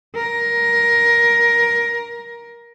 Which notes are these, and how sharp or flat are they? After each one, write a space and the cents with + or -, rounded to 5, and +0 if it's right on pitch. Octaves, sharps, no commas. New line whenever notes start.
A#4 +15